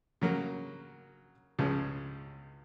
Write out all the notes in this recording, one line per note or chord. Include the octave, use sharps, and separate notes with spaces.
C#3 F#3 A#3
C#2 C#3 F3 G#3